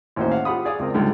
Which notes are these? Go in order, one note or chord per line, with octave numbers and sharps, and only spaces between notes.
A1 D#2 C#4 D#4 F#4 C5
F5 F#5
F4 G4 F#5 B5 D#6
G#4 D5 F5 D#6
C#2 C4 A#4
C#2 G#2 D3 G3